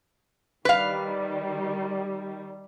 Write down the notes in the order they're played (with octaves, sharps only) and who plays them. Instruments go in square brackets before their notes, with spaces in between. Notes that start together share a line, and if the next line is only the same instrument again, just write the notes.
[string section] D#3 G3 [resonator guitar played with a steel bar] B4 F5